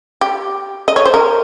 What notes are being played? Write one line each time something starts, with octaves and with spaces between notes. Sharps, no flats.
G4
D#5
C#5
C5
A#4